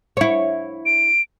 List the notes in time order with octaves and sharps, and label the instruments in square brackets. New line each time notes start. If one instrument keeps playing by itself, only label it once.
[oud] E4 C#5
[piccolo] D7